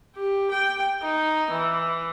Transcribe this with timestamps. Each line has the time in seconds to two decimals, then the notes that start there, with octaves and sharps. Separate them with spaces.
0.16 G4
0.51 G5
1.02 D#4
1.51 E3